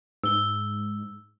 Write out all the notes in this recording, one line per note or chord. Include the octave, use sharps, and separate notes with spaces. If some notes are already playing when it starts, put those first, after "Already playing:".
G#2 E6 G7